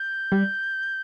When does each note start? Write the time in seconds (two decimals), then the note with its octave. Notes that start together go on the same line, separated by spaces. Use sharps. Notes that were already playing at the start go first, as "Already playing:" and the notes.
Already playing: G6
0.32 G3